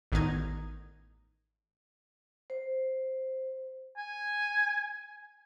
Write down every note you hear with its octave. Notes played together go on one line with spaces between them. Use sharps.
A1 D#3 B3 D#4 G#6
C5
G#5